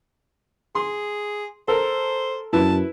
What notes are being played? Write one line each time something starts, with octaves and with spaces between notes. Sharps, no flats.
G#4 C6
A4 A#4 C5
F#2 E4 B4 A5